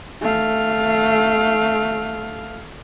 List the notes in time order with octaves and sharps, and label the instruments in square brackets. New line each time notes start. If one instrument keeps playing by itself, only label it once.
[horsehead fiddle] A3 F5